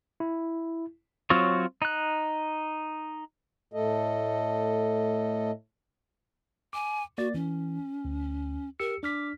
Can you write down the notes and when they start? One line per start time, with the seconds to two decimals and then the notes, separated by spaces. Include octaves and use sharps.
0.20 E4
1.30 F#3 C4 F4 F#4 C#5
1.82 D#4 F#6
3.73 A2 A3 A4 D#5
6.73 G#5 D6
7.18 A#3 F#4 D5 A6
7.34 E3 C#4
8.05 D2
8.79 G4 A#4 E6 C#7
9.03 D4 D6 F6 B6